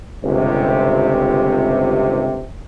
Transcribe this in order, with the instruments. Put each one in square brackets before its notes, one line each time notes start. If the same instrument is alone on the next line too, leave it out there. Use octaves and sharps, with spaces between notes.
[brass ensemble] G1 C#2 C3